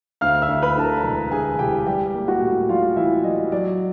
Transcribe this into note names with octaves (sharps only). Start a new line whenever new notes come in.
D2 F5 F6
E5 E6
D2
B4 B5
D3 A5
A#4 A#5
E1
D2 G#4 G#5
E1 G4 G5
G3 G4 G5
A#3
F#4 F#5
A2
G3 F4 F5
E3 E4 E5
G3 D#5
F#3 D5